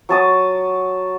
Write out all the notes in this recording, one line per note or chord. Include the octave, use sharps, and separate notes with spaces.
F#3 A5 D#6